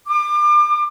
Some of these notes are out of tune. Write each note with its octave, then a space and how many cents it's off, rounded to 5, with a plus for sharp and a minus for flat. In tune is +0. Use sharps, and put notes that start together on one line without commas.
D6 +35